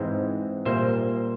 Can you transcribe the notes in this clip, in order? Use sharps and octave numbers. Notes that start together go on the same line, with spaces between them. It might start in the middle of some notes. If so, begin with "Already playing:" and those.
Already playing: G#2 E3 G#3 C4
A#2 G3 A#3 C5 E5